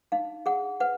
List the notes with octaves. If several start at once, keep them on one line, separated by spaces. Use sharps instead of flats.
D#4 F5
G#4 F#5
B4 F#5